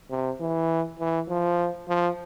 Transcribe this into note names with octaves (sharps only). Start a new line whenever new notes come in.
C3
E3
E3
F3
F3